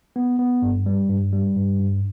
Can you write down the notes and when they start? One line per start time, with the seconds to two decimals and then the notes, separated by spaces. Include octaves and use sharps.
0.16 B3
0.39 B3
0.62 G2
0.86 G3
1.09 G2
1.33 G3
1.55 G2
1.80 G2